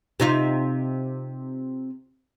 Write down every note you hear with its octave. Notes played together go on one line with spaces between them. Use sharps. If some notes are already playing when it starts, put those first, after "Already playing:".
C3 D#4 F4